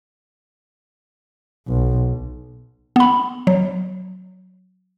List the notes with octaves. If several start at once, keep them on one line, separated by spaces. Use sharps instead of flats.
B1
B3 B5
F#3